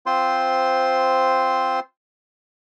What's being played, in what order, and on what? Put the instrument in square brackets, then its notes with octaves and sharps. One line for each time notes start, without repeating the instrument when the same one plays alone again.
[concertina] C4 F4 C5 C6